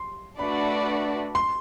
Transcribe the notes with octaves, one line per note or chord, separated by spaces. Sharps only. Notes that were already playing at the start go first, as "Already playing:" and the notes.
Already playing: C6
A3 D4 F#4 B4 D5 B5
C6